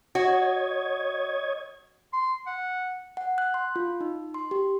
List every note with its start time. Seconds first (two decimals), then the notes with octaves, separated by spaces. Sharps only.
0.15 F#4 C#5 D#5 G#6
2.13 C6
2.46 F#5
3.17 F#5
3.38 F#6
3.54 C6
3.76 F4
4.01 D#4
4.34 C6
4.51 G4